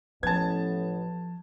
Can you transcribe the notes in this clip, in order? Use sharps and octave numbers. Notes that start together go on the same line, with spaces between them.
A1 F3 B3 A5 G#6